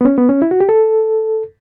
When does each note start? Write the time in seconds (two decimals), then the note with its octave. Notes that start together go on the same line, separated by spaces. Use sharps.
0.01 B3
0.05 C#4
0.18 B3
0.29 C#4
0.42 E4
0.51 F#4
0.60 G4
0.69 A4